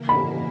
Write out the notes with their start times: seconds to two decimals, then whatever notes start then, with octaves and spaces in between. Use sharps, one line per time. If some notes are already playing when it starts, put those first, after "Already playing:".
Already playing: C#3 E3 A#3 E4 A#4
0.09 B5